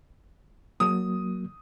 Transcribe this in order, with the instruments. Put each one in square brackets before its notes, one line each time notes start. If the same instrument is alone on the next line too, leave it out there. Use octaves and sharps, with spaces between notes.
[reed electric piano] F#3 A#3 [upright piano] D#6